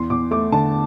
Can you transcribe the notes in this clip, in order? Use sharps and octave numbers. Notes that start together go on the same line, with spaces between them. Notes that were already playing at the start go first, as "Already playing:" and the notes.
Already playing: E2 C6
E2 D6
A3 D6
D3 A5